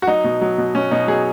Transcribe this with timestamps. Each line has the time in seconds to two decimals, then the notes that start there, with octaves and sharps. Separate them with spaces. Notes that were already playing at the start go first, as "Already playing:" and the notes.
0.02 F#4
0.07 F#3 D#4
0.24 B2
0.41 F#3
0.58 B2
0.74 B2 C#4
0.91 B2 D#4
1.07 F#3 G#4